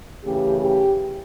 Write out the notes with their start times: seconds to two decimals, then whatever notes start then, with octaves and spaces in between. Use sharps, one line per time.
0.24 F#2 C#3 E3 A3 G4
0.60 G4